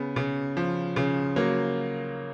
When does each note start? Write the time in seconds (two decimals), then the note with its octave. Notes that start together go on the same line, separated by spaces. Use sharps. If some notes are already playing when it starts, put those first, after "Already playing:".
Already playing: C#3 B3
0.16 C#3
0.57 F3
0.96 C#3
1.36 F#3 A#3